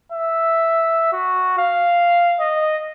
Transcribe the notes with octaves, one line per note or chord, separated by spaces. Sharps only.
E5
F#4
F5
D#5